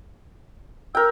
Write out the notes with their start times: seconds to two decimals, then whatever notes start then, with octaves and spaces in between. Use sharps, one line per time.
0.95 A#4 G5 E6